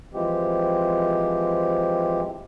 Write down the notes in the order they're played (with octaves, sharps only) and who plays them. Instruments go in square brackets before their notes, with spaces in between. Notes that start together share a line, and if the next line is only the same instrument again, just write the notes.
[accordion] E3 F3 G#3 C4 G4